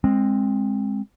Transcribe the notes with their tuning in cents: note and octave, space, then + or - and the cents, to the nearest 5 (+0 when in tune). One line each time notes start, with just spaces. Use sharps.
G#3 -10 C4 +15